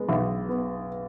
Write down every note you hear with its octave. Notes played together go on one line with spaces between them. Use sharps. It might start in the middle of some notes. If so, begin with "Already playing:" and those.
Already playing: G#3 B3
B1
B3